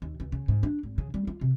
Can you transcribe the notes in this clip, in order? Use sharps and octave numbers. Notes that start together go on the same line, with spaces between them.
D#2
C#2
C#3
G#2
D4
G#1
C#3
G3
F4
C3